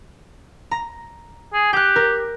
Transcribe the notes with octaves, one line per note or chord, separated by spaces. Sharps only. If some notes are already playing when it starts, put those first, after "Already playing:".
A#5
G#4
G4 G5 F#6
A#4